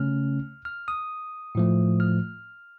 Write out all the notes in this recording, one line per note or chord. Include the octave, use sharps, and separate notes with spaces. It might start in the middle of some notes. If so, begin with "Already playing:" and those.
Already playing: C#3 A3 C#4 F6
F6
D#6
A2 F3 A3
F6